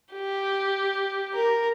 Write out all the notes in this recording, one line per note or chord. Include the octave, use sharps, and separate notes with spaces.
G4
A#4